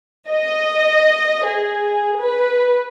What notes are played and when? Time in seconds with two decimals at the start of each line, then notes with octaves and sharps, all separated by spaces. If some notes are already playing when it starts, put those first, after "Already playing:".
0.30 D#5
1.46 G#4
2.20 B4